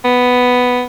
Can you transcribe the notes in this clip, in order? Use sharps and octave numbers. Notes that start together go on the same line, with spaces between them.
B3